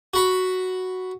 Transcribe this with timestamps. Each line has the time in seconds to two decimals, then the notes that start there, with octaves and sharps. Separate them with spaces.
0.14 F#4 B5